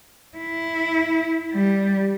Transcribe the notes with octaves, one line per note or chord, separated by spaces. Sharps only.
E4
G3